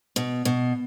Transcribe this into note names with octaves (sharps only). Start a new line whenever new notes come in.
B2
B2